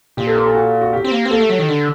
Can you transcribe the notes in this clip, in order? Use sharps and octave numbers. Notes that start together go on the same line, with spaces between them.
A#2 G4
A4
A#4
A4
F#4
F#4
G4
C4
A#3
C4
A#3 A4
A3
F#3
D#3
D3